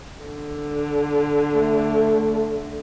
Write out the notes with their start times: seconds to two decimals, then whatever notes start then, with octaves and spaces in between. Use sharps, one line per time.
0.25 D3
1.55 A3